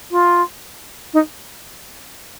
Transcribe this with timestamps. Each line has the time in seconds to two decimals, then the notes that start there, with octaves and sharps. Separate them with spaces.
0.11 F4
1.13 D#4